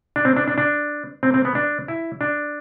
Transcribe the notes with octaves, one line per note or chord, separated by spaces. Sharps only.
D4
C4
D4
D4
D4
C4
C4
B3
D4
E4
D4